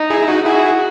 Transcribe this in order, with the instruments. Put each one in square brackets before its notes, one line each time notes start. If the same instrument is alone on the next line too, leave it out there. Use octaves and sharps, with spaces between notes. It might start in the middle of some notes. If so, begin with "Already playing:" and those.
Already playing: [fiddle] D#4
[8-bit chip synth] E4 G#4
E4
D#4 F#4
[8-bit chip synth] E4 G#4 [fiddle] F#4